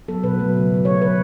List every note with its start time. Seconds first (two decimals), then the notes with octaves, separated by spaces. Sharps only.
0.08 F#3 B3 A4
0.23 B2 B4
0.39 F#3 A3
0.55 C#3
0.70 F#3 A3
0.85 D3 C#5
1.01 F#3 B4
1.06 A3